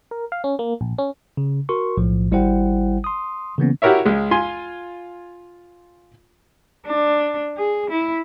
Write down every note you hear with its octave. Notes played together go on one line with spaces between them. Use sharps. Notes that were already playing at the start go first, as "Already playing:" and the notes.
A#4
F5
C#4
A#3
A#1
C#4
C#3
F#4 A#4 C6 C#6
B1 A2 F3
G#1 G3 E4 C5 F#5 G5
C6 D#6
C#3 E3 A#3 B3 C#4
E4 F#4 G4 A#4 C#5 E5
C#2 G#3
F4 G#5 C6
D4
G#4
E4